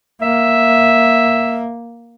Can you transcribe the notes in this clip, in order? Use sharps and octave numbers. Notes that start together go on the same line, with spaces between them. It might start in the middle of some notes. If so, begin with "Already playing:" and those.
A#3 E5